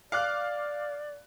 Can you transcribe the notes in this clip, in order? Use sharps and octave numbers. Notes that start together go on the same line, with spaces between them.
D5 F5 D6 F#6